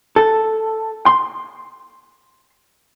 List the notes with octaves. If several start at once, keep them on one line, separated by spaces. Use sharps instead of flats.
A4
C6